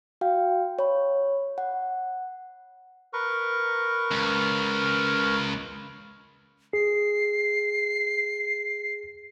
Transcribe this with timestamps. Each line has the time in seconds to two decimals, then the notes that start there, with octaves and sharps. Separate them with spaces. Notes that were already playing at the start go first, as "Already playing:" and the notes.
0.21 F#4 F5 G5
0.79 C#5 B5
1.58 F#5
3.13 A#4 B4 C#6
4.11 C#2
6.73 G#4 C7